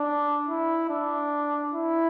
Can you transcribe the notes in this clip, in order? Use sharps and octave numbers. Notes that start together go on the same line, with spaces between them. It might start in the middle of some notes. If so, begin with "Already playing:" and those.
Already playing: D4
E4
D4
E4